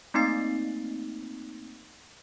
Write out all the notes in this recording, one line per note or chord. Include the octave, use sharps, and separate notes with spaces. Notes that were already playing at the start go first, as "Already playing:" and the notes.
A3 A#3 C4 D#4 A6 C7